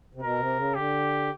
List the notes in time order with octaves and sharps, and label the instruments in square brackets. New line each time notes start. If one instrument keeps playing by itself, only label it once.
[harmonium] C3
[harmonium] B2 [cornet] A#4
[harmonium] C3
C#3
[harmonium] D3 [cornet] G4